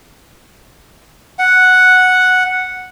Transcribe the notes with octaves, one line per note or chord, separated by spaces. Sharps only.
F#5